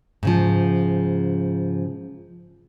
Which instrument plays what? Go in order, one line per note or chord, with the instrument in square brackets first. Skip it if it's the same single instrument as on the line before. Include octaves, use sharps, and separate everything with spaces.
[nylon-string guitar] G#2 C#3 F3